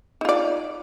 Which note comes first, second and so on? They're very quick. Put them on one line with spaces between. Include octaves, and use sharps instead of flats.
D#4 F4 D5